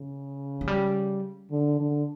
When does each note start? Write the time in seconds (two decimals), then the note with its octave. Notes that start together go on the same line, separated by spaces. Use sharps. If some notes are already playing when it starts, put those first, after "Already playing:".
Already playing: C#3
0.61 F#3
0.68 G3
1.51 D3
1.80 D3